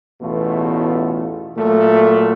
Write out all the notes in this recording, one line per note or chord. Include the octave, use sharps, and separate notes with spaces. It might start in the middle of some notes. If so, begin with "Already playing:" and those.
A1 E2 B2 A3 F4
A#2 F#3 A3